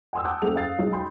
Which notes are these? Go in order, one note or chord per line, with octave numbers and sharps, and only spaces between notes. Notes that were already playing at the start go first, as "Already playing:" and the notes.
F#5 G#5 C6 D#6 E6
F#5 A5 D6 F#6 G6
F#1 A3 A#3 G#4 F#5 F7
F5 D#6 A6 C7
B1 G#3
G5 B5 C6 G6